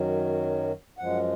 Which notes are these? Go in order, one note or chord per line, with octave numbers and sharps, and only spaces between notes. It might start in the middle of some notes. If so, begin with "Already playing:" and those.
Already playing: F#2 D#3 F#3
F#2 F3 G#3 F#5